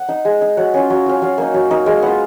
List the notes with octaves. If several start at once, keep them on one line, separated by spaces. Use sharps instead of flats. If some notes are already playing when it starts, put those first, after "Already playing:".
Already playing: F#5
D#4
G#3
D#4
F#3 F#5
C#4 F4
F#3
C#4 F4
F#3 F5
A#3 D#4
F#3
A#3 D#4
G#3 F5
B3 F4 F#5